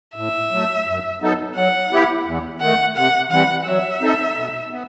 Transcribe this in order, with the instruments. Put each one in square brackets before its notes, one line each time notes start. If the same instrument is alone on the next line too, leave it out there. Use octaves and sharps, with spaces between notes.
[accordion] A2 [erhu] E5
[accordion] F#3 A3
F#2
F#3 B3 D#4 A4
[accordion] F#3 [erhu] F#5
[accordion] B3 E4 G4
E2
[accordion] D#3 A3 [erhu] F#5
[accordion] C3 [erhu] F#5
[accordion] E3 G3 C4 [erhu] F#5
[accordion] F#3 [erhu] E5
[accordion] C4 D#4 A4
B2
B3